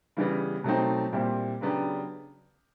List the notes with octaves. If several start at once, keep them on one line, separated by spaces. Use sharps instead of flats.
C#3 E3 G3 B3
B2 F#3 A3 C4 D#4
A#2 G3 C4 E4
C#3 F#3 B3 D4 G4